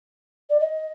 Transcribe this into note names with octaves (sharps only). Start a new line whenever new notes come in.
D5
D#5